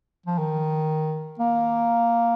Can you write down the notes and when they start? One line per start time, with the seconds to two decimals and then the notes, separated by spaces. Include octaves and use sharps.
0.26 F3
0.39 D#3
1.39 A#3